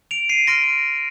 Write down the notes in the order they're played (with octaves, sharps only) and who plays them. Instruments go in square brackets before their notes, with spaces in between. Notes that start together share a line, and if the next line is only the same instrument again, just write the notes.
[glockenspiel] D7 F7
C7 D#7
C6 F6 A#6 D7